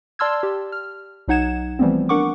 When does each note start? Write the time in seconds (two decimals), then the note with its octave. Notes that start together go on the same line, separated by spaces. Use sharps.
0.19 D5 A5 C6 E6 F6 G#6
0.43 G4
0.72 F6
1.28 B1 F#3 D#4 F#5 G#6 E7
1.79 E3 F3 G3 A3 B3 C4
2.09 D4 A#4 F#5 C#6 D6